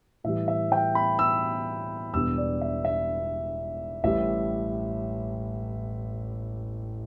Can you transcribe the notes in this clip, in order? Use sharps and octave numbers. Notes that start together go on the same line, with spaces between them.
A2 E3 G3 E5
E5
G5
B5
E6
E1 E2 E3 G3 D4 E6
D5
E5
E5
A1 A2 G3 E5